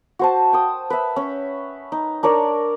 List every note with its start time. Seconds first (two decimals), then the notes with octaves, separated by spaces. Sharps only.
0.19 F#4 C5 A5
0.53 G5 D#6
0.90 B4 E5
1.16 C#4
1.92 D#4
2.23 D4 A#4 C#5 D5